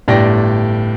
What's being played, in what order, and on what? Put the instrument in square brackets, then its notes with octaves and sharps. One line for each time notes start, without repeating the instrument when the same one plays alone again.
[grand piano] G1 A2 G4 D5 G5 A#6